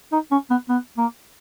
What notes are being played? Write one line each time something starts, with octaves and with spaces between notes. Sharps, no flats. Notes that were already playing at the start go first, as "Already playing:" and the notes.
D#4
C#4
B3
B3
A#3